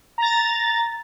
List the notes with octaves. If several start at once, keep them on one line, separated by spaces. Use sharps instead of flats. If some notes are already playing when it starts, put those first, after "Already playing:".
A#5 A6